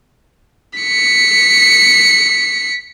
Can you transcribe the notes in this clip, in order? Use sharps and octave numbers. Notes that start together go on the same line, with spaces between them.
B6 C#7